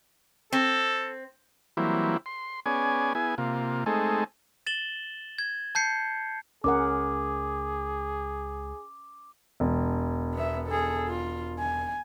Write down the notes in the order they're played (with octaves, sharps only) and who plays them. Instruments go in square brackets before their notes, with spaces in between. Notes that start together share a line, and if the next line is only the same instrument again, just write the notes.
[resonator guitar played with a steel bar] C4 [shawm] A4
[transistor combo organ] E3 F#3 G3 A#3 C4 E4
C6
B3 C#4 G#4 D5 G#5
B3 E4 G#4 G#5
C3 A#3 F4
G#3 A3 C4 D#4 G#4 A4
[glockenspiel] A6 E7 F#7 G7
G#6
A5 G6 C7 C#7
[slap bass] C#2 [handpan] C#4 A#4 F#5 [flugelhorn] G#4 [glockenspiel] D6
[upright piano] E1
[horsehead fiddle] B3 E5
G#4 A4
F4
G#5